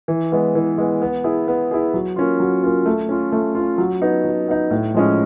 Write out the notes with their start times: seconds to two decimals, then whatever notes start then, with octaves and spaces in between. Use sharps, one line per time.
0.08 E3
0.32 G#3 B3
0.55 E3
0.78 G#3 B3
1.02 B3
1.24 E4 G#4
1.48 B3
1.71 E4 G#4
1.94 F#3
2.16 A#3 C#4 F4
2.40 F#3
2.64 A#3 C#4 F4
2.86 A3
3.09 C#4 F4
3.32 A3
3.55 F4
3.60 C#4
3.78 F#3
4.02 B3 D#4
4.24 F#3
4.48 B3 D#4
4.71 A2
4.94 F3 G#3 C#4